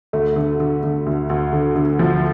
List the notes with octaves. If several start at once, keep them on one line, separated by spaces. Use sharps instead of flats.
D2 A3
D3
D3
D3
D2
D2
D3
D3
D2 F3